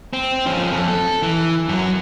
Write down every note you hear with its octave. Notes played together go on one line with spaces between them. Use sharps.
C4
F3 C#4
F2
A4
E3
F#2 F#3